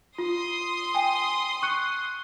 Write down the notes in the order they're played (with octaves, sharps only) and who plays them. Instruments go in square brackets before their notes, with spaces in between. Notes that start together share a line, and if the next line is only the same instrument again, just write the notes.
[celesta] F4 [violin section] C6 D#6
[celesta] G5 G#5
C#6 F#6 C#7